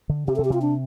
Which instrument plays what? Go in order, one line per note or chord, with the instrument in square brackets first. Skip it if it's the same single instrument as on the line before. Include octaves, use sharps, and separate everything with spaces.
[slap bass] D3
[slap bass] C3 [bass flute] G4
[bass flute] A4
[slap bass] C3
[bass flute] G4
[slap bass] C3 [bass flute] F4
[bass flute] D4